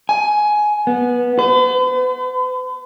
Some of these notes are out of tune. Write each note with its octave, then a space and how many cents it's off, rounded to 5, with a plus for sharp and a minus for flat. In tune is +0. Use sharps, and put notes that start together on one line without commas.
G#5 +15
B3 -15
B4 +45